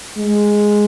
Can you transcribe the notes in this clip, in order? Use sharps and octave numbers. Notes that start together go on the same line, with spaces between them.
G#3